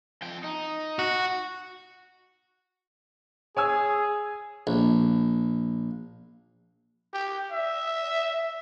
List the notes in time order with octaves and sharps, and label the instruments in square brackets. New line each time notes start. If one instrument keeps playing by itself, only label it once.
[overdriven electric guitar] F2 G5
D#4
[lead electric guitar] F#4
[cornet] G#4 [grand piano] C#5 G#5 E6
[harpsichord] A#1
[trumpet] G4
E5